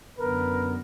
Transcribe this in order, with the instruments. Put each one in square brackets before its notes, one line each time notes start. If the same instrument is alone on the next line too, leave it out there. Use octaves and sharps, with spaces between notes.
[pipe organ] F#2 D3 B3 [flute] A#4 [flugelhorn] B4